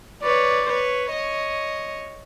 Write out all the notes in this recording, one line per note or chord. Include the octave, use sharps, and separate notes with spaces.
B4 C#5 D5
B4 C#5
C#5 D#5